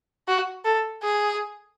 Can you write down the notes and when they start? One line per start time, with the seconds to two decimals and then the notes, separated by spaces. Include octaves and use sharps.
0.28 F#4
0.65 A4
1.02 G#4